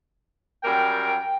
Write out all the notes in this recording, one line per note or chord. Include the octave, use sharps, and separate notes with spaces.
F#2 G3 A#4 G5